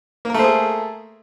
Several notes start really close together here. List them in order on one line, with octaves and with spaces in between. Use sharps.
A#3 A#4 A3 C5 G#4